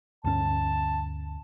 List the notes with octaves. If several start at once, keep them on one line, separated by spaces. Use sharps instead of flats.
D2 G2 C#4 A5